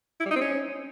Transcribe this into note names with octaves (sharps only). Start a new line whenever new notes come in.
E4
G3
D#4
C4
C#4